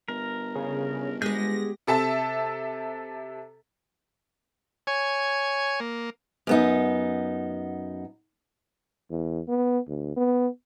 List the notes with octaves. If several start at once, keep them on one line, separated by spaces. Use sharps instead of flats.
G1 A#4
C#3
G#3 B3 G4 G6 A#6
C3 A4 E5 A5
C#5 G#5
A#3
F#2 B3 D#4
E2
B3
D2
B3